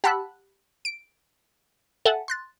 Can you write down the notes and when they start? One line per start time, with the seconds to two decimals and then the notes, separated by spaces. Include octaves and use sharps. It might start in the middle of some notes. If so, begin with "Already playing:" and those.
0.04 G4 F#5 A5 B5 E6 F#6
0.85 D7
2.05 A4 E5 F#5 G#5 A5
2.28 C6 F#6 A6